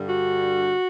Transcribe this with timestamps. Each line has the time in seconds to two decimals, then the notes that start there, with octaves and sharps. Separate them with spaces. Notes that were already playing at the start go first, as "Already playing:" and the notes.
Already playing: G2 D3 G3
0.09 F#4